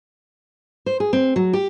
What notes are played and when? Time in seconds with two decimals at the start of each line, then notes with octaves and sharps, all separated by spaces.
0.86 C5
1.00 G#4
1.13 C4
1.36 F#3
1.53 G4